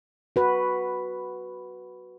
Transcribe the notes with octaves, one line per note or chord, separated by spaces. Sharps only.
F#4 B4